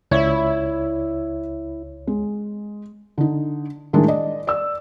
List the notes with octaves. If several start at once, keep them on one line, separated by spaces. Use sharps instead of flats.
C#2 E4 C#5 D5 E5 G#6
G#3
D3 D#4
A2 D#3 G3 G#3 D4 G#4
D5 D#5
D5 E6